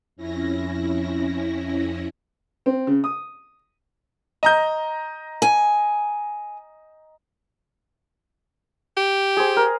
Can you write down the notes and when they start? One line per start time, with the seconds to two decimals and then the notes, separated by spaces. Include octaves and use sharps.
0.16 F2 C#4 E4 A#6
2.66 C4
2.87 C#3
3.04 D#6
4.43 D#5 A#5 G6
5.42 G#5
8.97 G4
9.37 G#4 C5
9.57 A#4